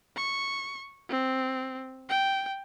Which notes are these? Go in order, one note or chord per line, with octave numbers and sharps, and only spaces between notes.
C#6
C4
G5